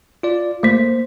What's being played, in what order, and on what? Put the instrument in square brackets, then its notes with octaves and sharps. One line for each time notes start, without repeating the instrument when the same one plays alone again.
[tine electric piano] F4 D5
[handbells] A3 B6 [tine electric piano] A#3 C5